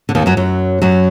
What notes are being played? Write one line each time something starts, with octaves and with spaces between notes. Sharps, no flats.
D3
D#2 D#3
F#2 F#3
F#2 F#3
F#2 F#3